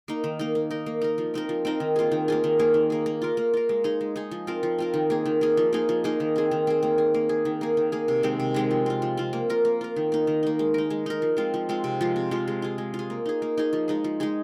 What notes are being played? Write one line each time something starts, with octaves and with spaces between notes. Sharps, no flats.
A#3 D#4
D#3
A#3 D#4
A#3
D#4 A#4
A#3
D#4 A#4
F3
C4 D#4 A#4
F3
C4 D#4 A#4
D#3
A#3 F4 G#4
D#3
A#3 F4 G#4
D#3
A#3 G#4
D#3
A#3 G#4
A#3
F4 A#4
A#3
F4 A#4
G#3
D#4 G#4
G#3
D#4 G#4
F3
C4 F4 A#4
F3
C4 F4 A#4
D#3
A#3 G#4
D#3
A#3 G#4
F3
A#3 D#4 G#4
F3
A#3 D#4 G#4
D#3
C4 G#4
D#3
C4 G#4
A#3
G#4
A#3
G#4
D#3
A#3 G#4
D#3
A#3 G#4
C3
D#3 G#3 C4
C3
D#3 G#3 C4
F3
C4 F4
F3
C4 F4
A#3
F4 A#4
A#3
F4 A#4
D#3
A#3 D#4
D#3
A#3 D#4
G#3
D#4 A#4
G#3
D#4 A#4
F3
G#3 C4 F4
F3
G#3 C4 F4
C3
F3 G#3 F4
C3
F3 G#3 F4
G#3
F4 G#4
G#3
F4
G#4
A#3
D#4 G#4
A#3
D#4 G#4
F3
G#3 D#4 G#4
F3
G#3 D#4 G#4